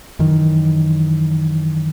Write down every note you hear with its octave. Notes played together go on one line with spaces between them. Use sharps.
F#2 D#3 E3